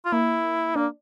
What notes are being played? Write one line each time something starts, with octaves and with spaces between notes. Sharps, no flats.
F4
A#3 E4
A#3 D4